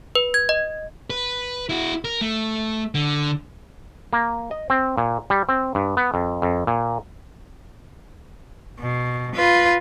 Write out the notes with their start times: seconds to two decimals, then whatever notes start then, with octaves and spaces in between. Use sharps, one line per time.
0.15 B4
0.34 G#6
0.49 D#5
1.10 B4
1.69 E4 F#4
2.05 A#4
2.21 A3
2.95 D3
4.13 A#3
4.51 D#5
4.70 C4
4.98 A#2
5.30 G3
5.49 C4
5.75 G2
5.97 B3
6.14 F2
6.42 F2
6.67 A#2
8.80 B2
9.35 F4 B4